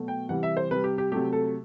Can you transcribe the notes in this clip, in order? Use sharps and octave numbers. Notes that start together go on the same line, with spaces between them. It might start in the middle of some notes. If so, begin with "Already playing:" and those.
Already playing: B2 F#3 A3
G5
C3 E3 G3 F#5
E5
C5
C3 G3 B4
G4
G4
C3 F#3 A3 G4
A4